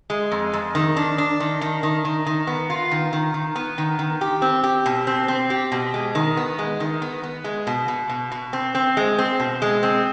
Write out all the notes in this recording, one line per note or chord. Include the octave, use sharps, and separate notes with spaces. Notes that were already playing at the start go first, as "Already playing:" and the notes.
G#3
F2
F2
D#3
D4
D4
D#3
D#3
D#3
D#3
D#3
B3
F4
D#3
D#3
D#3
B3
D#3
D#3
G4
C4
G4
B2
C4
C4
G4
B2
G#3
D#3
B3
G#3
D#3
B3
B3
G#3
B2
B2
B2
B2
C4
C4
G#3
C4
B2
G#3
C4